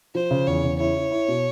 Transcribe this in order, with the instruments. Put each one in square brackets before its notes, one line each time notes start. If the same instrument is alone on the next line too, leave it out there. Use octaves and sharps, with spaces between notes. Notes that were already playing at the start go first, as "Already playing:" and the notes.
[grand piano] F3 [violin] C5
[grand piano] C#3
[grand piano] E2 [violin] C#5
[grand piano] C#3
[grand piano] E4 [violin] C#5
[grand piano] E4
E4
B2